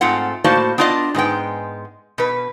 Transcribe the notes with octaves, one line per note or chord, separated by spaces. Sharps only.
G#2 A3 C4 F4 F#5
A2 A#3 F#4 C5 D5 A5
B3 D4 F4 D5 D#5
G#2 G#3 B3 G5
B2 B4